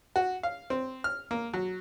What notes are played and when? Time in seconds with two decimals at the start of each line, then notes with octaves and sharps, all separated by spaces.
0.16 F#4
0.43 F5
0.70 C4
1.04 F6
1.31 A#3
1.54 F#3